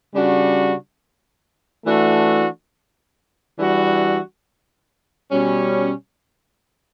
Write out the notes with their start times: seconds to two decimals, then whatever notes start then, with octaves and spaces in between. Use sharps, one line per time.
0.14 C#3 G3 D4 F#4
1.86 E3 A3 D4 F#4
3.59 E3 G3 D4 F#4
5.31 B2 G3 C#4